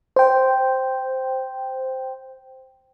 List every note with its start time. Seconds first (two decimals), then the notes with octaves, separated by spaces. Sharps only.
0.16 C5 G5